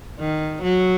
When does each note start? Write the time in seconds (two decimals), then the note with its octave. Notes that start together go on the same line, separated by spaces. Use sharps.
0.19 D#3
0.63 F#3